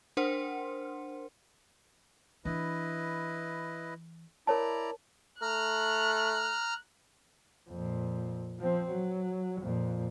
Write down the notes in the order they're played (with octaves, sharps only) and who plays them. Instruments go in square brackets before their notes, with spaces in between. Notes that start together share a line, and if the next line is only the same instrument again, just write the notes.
[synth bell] D4 A#4 C5 F#5 C6
[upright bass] E3 D4 [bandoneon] E4 B4 D#5
[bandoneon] E4 D5 A#5 [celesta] A#4 C#5 A5
[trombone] A3 [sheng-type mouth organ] A#5 F6 [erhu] F#6
[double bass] F2 A#2
F3 C4
F#3
F2 A#2